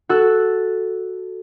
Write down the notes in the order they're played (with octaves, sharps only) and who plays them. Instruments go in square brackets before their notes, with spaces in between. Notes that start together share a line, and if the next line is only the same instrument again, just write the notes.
[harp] F#4 A4 E6 F#6